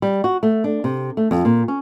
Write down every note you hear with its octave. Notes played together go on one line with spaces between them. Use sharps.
G3
F#4
A3
D4
C3
A3
F2
A#2
C#4